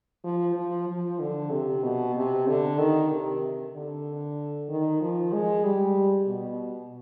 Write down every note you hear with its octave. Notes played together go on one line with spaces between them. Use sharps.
F3
F3
F3
D3
C3
B2
C3
D3
D#3
C3
D3
D#3
F3
G#3
G3
B2